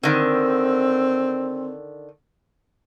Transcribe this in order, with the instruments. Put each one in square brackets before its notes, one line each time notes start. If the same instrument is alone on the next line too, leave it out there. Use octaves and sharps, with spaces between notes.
[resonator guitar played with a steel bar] D3 D#3 [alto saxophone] C4